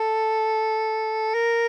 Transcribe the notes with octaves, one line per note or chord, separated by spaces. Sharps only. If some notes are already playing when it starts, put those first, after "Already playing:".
Already playing: A4
A#4